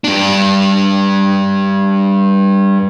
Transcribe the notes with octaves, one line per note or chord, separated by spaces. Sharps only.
G2 D4